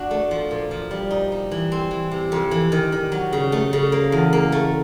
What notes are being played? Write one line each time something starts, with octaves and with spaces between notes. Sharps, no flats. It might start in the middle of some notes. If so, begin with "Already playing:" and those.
Already playing: D4 F#4
A3
F3
A#2
F3
G3
D#4
G3
E3
C4
E3
C3
F2
E3
D#3
D#3
F#3
C#3
A3
C#3
A#3
E2
A#3
A3